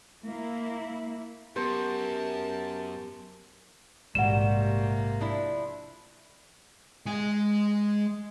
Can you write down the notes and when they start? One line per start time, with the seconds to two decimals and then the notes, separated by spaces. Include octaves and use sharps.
0.25 A#3 E4
1.56 F#2 F#3 B3 G4 A#4 C5 A5
4.15 A#1 G#2 C3 G3 A#3 F#4 F#5 E7
5.21 F3 D4 E4
7.06 G#3 G#5